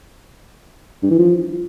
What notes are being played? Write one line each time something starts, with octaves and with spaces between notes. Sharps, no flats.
G2
E3
F3